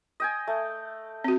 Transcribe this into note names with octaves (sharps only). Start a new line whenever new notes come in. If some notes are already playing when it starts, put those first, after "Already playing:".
D#5 G5 G#5
A3
C4 F#4